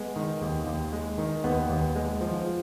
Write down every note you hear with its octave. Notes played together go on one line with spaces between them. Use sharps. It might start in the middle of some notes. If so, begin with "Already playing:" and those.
Already playing: G#3 B3
D#3
D#2
D#2
G#3
D#3
D#2 B3
D#2
G#3
F3